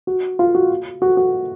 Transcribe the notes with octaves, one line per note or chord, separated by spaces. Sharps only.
F#4
F4
F#4
F#4
F#4